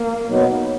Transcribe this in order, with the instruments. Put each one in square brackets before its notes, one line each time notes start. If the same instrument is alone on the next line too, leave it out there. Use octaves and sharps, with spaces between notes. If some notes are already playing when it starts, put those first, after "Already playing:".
Already playing: [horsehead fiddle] A#3
[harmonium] B2 F#3 B3 D#4